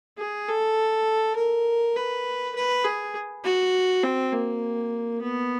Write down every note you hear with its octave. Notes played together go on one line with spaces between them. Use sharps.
G#4
A4
A#4
B4
B4
G#4
F#4
C4
A#3
B3